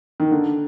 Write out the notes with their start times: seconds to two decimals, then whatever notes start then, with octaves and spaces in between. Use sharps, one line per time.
0.20 D#3
0.31 D3